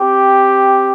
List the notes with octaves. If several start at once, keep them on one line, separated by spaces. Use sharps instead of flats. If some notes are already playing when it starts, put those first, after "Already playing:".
Already playing: C4 G4